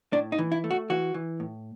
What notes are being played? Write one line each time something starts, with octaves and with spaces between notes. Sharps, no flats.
A2 D4
D#4
E3
E4
A3
F#4
E3 F#4
E3
A2